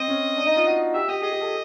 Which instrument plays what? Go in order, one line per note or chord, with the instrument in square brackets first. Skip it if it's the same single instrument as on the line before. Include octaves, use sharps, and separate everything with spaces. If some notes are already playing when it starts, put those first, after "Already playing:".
Already playing: [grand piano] C4 [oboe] D#5
[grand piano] C#4
D4
D#4
F4
F#4
[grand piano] G4 [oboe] E5
[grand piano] G4 [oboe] D#5
[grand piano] G#4 [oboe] D#5
[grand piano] G#4
A4